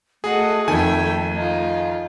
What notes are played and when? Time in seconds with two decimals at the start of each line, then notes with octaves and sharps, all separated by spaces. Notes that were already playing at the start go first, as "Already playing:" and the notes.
0.24 A3 F#4 G#4 D#5
0.68 F2 D#3 E5 G5 G#5
1.35 D#4 F4